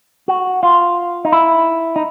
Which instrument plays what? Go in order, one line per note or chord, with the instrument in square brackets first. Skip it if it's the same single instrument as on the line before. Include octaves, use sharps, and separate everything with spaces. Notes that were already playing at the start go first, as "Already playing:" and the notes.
[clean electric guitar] F#4
F4
D#4
E4
D#4